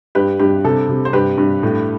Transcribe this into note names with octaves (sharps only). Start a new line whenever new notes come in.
G2 G4 B4
G2 G4
C3 A4
C3
C5
G2 G4 B4
G2
A2